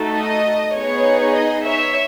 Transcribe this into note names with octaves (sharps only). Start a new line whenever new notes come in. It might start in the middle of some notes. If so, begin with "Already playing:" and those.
Already playing: A3 D#4 F#4 A4
D#5
B3 D#4 G#4 C#5
D#5
C#5 E5